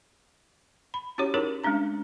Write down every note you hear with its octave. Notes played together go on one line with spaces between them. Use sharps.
B5
C#4 E4 F#4 G4 C#5
C#4 D#4 E4 G#4 A#4 C#5
G#3 A3 C#4 D4 A#5